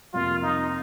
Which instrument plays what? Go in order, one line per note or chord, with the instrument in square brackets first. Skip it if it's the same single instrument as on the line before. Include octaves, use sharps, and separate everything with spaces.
[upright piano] F2 C3 F3 A#3 [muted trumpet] F4
[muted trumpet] D#4